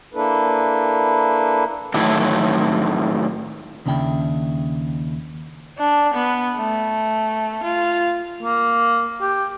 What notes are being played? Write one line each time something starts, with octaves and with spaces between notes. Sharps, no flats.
A#3 D4 E4 A4 B4
A2 D#3 E3 F#3 E4 A4
D#2 C#3 D4 E4 G5
D4
B3
A3
F4
A#3
G4